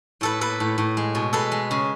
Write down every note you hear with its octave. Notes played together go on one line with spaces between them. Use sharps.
A2 A4 B4
A#3 A4 B4
A2
A2
G#3
B2
G#3 A4 B4
G#3
C#3